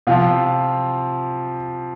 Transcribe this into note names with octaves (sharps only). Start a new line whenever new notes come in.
C3 F3 F4